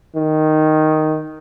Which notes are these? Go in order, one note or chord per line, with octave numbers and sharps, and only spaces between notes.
D#3